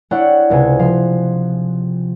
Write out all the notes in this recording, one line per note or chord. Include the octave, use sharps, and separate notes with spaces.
D4 E4 C#5 F#5 G5
C#2 C3 C5 G#5
F3 F5 C6